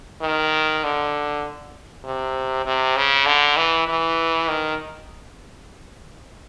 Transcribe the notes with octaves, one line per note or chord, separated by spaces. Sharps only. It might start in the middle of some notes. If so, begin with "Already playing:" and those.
D#3
D3
C3
C3
C#3
D3
E3
E3
D#3